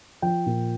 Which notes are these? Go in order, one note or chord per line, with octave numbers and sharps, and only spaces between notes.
F3 G5
A#2